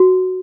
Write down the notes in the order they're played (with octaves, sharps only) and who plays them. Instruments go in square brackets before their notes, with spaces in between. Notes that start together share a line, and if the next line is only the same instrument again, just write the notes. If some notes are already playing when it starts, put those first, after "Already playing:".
Already playing: [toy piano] F#4